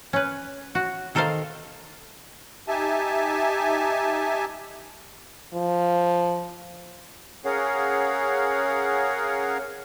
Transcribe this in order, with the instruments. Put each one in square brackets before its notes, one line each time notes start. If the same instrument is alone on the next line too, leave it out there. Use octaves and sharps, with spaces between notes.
[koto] C#4 B4
F#4
D#3 A4 A#4 C5 F5 A#5
[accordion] D#4 G4 E5 G#5 A5
[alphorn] F3
[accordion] C#4 G#4 A#4 C#5 F5 F#5